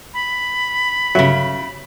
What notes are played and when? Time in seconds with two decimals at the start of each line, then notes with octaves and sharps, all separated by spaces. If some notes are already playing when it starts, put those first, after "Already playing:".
0.14 B5
1.15 G1 C#3 F#3 E5